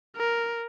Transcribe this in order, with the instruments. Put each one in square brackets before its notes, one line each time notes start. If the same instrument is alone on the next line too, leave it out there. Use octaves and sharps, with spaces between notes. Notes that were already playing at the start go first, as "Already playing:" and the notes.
[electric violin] A#4